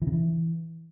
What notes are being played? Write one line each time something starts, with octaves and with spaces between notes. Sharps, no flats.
E3
C#3
E3